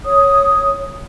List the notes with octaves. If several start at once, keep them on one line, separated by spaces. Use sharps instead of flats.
C#5 D#6